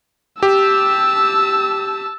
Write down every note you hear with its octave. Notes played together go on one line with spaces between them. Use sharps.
G4 A5 E6